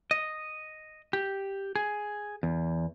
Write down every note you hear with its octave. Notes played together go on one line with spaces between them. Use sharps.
D#5
G4
G#4
E2